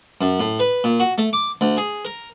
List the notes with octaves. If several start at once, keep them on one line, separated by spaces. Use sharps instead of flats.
F#2
A2
B4
A#2
F#4
A3
D6
D2
G#4
A#4